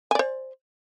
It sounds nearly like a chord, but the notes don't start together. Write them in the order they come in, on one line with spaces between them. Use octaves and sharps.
G#5 D5 C5